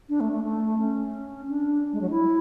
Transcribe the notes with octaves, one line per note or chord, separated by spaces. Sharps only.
D4
A3
A3
A3
C#4
D4
G#3
F#3
E4